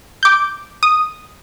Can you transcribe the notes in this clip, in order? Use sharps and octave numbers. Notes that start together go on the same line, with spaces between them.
D6 G6
D#6